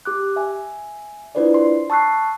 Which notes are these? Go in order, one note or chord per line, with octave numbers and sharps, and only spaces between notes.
G4 D6 F#6
E5 G#5
D4 E4 F4 B4 C5 D5
C6
A5 C#6 E6 F#6 C7